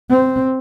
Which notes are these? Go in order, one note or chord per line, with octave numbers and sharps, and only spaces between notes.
C4